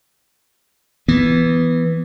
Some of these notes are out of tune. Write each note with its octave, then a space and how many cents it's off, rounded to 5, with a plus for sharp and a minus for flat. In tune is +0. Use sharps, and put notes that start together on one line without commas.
E3 +0 B3 +0